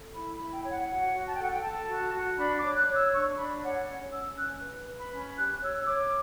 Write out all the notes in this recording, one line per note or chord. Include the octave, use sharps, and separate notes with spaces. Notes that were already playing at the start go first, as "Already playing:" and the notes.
Already playing: A4
E4 B5
B5
E4
G5
C#5
F#5
F#4 F#5
F#4
A5
G5
A4 F#5
G5
A4 A5
F#4
F#4
D4 B5
D6
C#5
F#6
C#5
E6
D4 C#6
D4 B5
C#5 F#5
C#4
C#4 E6
C#4 F#6
B4
B4
B5
C#4
B5
G4 F#6
C#5 E6
C#5 D6